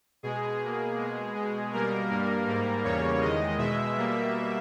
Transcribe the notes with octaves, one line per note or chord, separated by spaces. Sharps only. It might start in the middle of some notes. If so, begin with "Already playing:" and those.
B2 G#3 G#4
B2 A#3
B2 G#3
B2 G#3
B2 G3 A#3 A#4
G2 G3 A#3
G#2 G3 A#3
E2 C#3 G3 A#3 C#5
E2 D#3 G#3 D#5
B2 G#3 E5
B2 G3 A#3